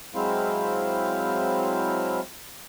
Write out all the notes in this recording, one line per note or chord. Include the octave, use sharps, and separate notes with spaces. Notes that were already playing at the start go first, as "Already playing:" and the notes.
F#3 G#3 C4 E4 C5 F5